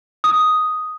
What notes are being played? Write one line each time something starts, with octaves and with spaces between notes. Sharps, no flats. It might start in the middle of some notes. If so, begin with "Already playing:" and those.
D#6